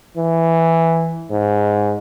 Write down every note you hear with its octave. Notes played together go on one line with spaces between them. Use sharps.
E3
G#2